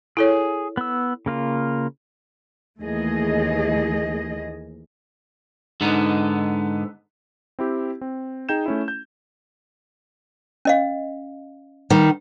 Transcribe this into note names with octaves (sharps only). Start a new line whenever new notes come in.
E4 G#4 A4 C#5
B3 E6
C#3 A#3 F4
D#2 E3 A3 G#4 D#5
G#2 D3 B3 D#4
C4 E4 G4
C4
D#4 G#4 G5 G6 E7
A3 C#4 E4
G6
C#4 D#5 F5
D#3 G3